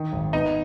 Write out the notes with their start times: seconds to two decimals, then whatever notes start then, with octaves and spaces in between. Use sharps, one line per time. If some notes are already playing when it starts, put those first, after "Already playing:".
Already playing: D#3
0.13 G#1
0.33 B3 D#4